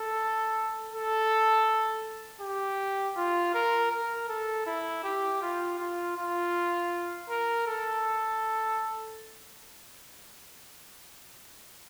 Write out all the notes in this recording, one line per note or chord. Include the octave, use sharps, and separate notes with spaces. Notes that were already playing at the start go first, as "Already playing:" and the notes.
Already playing: A4
A4
G4
F4
A#4
A#4
A4
E4
G4
F4
F4
F4
A#4
A4